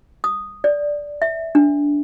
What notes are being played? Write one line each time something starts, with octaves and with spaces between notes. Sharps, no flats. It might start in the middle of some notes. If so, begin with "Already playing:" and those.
D#6
D5
E5
D4